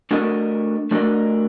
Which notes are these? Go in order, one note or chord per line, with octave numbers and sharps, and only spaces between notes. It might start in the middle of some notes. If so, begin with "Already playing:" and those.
A3 D4 F#4 A#4 D#5
A3 D4 F#4 A#4 D#5